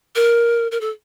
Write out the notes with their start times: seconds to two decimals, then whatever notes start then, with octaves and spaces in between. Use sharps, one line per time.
0.16 A#4
0.71 A#4
0.81 A4